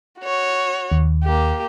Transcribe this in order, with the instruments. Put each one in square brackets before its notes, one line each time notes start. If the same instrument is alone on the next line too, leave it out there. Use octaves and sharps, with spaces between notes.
[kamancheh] F#4 C#5
[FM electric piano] D#2
[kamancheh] A#3 G4